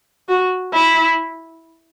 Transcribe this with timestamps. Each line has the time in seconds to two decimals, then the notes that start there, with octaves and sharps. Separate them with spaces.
0.29 F#4
0.73 E4